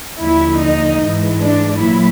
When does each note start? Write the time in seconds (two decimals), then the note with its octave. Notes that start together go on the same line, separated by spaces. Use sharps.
0.19 D#2 D3 F3 E4
0.60 D#4
1.00 G#2 E3 G#3
1.40 D4
1.79 A#2 F#3 E4